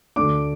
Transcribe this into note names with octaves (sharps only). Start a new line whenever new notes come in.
D2 D3 A3 D4 D6